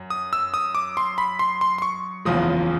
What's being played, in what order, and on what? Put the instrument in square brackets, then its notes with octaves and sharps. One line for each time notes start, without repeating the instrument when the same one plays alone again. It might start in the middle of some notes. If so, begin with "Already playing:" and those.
Already playing: [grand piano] F#2
[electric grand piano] D#6
E6
D#6
D6
C6
B5
C6
C6
C6
C#6
[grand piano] F#1 E2 C#3 F3 G#3 [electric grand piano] D#6